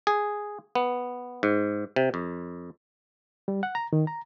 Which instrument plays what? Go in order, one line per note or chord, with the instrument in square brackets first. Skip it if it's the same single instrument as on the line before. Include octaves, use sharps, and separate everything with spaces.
[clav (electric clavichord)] G#4
B3
G#2
C3
F2
[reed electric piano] G3
F#5
A#5
D#3
A#5